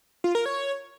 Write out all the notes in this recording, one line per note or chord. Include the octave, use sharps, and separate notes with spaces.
F4
A#4
C#5